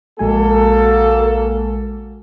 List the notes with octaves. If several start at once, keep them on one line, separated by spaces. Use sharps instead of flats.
A#1 G#3 A#3 F#4 A4 G#5